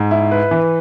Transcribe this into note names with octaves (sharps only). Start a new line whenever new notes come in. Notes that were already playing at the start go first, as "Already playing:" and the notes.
Already playing: G#2
E4
B4
E3